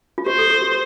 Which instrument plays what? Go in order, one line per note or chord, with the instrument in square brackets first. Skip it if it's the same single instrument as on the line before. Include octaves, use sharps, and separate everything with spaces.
[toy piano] F4
[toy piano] G4 [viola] C5
[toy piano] A4
A4
G4